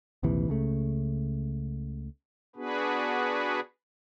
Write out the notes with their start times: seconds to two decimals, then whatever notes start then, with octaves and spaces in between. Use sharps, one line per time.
0.23 A#1 D#2 C3 E3
0.49 C#2 C#3 A3
2.56 B3 D4 F#4 G#4 B4